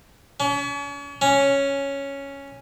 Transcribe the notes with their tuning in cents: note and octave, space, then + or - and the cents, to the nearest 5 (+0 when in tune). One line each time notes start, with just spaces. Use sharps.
C#4 +40
C#4 +0